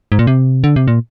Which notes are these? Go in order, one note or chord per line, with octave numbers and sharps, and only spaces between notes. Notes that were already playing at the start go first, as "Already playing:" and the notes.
G#2
A#2
C3
D3
C3
A#2